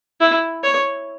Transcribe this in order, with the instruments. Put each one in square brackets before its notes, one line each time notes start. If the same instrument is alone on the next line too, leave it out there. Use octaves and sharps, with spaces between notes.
[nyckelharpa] E4
C#5